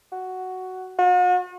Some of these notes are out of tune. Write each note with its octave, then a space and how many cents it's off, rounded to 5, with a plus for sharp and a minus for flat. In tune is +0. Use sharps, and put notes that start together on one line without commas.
F#4 +5
F#4 -45